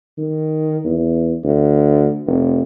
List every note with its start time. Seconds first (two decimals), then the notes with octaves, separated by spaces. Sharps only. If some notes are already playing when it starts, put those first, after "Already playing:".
0.18 D#3
0.84 E2
1.43 D2
2.26 F1